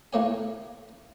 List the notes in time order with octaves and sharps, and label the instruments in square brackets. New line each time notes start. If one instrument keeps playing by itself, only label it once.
[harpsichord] A2 A3 A#3 C#5 G#5